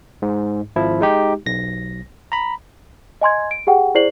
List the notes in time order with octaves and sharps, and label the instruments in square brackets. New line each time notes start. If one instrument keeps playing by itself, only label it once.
[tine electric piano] G#2
G#1 F3 E4
G#3 D#4 G4
B1 A#6
A#5 B5
[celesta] D#5 G#5 C6 G#6
D7
G4 G#4 F#5 G5
E4 G#4 C5 D5 C7 F#7